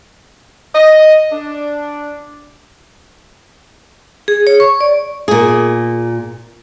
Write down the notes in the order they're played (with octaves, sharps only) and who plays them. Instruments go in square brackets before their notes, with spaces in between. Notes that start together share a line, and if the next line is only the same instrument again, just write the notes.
[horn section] D#5
D4
[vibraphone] G#4
C#5
C#6
D5
[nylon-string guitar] A#2 G#4